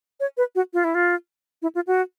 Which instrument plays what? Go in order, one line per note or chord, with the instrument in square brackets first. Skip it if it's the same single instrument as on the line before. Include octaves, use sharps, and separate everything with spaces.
[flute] C#5
B4
F#4
F4
E4
F4
E4
F4
F#4